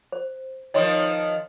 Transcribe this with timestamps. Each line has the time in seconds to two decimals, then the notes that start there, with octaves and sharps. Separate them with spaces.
0.12 C5
0.74 D#3 F3 C#5 D#5 C6